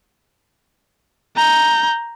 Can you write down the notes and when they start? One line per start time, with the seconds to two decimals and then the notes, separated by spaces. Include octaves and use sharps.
1.36 A#5 G6